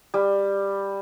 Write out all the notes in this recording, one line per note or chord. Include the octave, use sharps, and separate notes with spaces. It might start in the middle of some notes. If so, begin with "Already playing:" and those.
G3